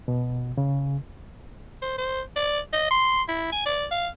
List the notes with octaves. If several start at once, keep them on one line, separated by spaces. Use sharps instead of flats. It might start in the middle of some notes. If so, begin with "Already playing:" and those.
B2
C#3
C5
C5
D5
D#5
C6
E4
G#5
D5
F5